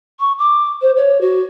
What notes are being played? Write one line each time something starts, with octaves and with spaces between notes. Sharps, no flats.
C#6
D6
C5
C#5
F#4